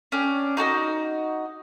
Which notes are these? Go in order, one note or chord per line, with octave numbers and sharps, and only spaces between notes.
C#4 D4 G5
D#4 F#4 A4 D#5